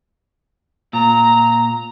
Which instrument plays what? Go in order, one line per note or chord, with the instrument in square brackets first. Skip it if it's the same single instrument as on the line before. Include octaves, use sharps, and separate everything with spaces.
[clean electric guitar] A#2 [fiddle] A#5